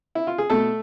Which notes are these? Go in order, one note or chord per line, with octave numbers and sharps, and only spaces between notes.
E4
F4
G#4
B2 A3 A4